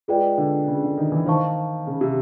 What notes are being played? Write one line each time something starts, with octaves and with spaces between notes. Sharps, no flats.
G#3 F4 G#4 B4 D5 G5
D3
C#3
D3
D#3
E3
D#3 C5 F5 A5 C#6
C#3
C3